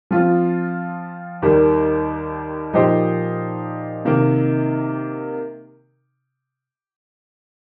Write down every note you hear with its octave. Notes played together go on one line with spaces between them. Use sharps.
F3 C4 F4
D#2 D#3 G3
A#2 F3 D#4 G4 C5
C3 D#3 A#3